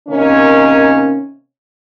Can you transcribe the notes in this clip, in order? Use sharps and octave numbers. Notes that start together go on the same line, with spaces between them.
C3 D#3 A#3 C#4